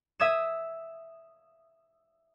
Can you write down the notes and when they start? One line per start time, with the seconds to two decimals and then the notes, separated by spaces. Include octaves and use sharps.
0.20 E5 D#6 G#6 E7